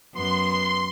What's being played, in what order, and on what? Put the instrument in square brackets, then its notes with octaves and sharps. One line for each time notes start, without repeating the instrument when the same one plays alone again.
[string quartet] F#2 B3 [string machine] C6